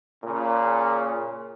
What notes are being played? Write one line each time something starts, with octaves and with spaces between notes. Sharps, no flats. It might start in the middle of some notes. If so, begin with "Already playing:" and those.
A#2 C#3